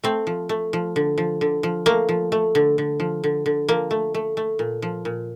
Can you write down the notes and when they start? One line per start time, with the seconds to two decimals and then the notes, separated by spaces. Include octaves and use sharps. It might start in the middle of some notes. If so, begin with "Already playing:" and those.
0.04 A3 C4
0.27 F3
0.49 A3
0.73 F3
0.96 D3
1.18 F3
1.41 D3
1.63 F3
1.86 A3 A#3
2.09 F3
2.32 A3
2.55 D3
2.78 D3
3.00 F3
3.24 D3
3.46 D3
3.69 F3 A#3
3.91 A3
4.14 A3
4.37 A3
4.59 A#2
4.82 F3
5.05 A#2